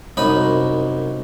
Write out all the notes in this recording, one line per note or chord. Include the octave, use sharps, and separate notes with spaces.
C2 F#2 D#4 D#5 B5